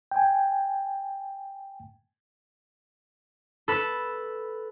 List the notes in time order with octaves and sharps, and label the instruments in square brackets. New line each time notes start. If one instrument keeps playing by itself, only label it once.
[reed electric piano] G5 G#5
[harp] A4 B4